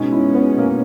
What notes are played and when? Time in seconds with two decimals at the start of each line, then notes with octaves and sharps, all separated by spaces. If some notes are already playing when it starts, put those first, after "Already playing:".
Already playing: B2 G#3 C#4 D#4
0.12 E4
0.35 B3
0.58 A#3